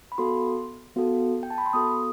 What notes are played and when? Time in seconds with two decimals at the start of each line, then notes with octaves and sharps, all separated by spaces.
0.12 B5
0.18 B3 F#4 A4 C6
0.96 B3 F#4 A4
1.43 G5
1.50 A5
1.58 B5
1.66 C6
1.73 B3 F#4 A4 D#6